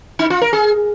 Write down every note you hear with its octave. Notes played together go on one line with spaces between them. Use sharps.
D#4
F4
A#4
G#4